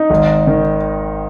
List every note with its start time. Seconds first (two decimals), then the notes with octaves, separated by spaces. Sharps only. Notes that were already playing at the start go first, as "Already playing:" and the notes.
Already playing: D#4
0.10 G#1
0.47 D#3